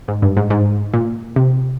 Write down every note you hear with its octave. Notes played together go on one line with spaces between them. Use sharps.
G#2
G2
G#2
G#2
A#2
C3